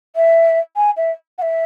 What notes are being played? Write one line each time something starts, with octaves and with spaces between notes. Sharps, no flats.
E5
G#5
E5
F#5
E5